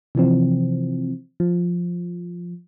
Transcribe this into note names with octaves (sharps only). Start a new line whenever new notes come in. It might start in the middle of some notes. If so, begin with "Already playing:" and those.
C3 E3 F3 C4
F3